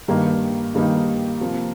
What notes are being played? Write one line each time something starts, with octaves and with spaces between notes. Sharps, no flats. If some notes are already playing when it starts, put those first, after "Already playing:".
G2 D#3 G3 A#3 D#4
G2 D#3 G3 A#3 D#4
C3 F3 A#3